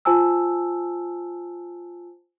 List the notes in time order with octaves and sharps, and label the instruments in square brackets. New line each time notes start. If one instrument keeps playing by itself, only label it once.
[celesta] F4 C5 G#5 A5 E6